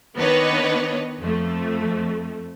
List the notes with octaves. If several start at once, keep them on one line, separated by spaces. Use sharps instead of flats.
D#3 B3 D4 B4 C#5 D#5
F2 A3